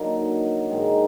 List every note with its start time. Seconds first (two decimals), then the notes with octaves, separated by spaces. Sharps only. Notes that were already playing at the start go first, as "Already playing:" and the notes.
Already playing: D3 F#3 A#3 D#4
0.69 G#2 D#3 G#3 D#4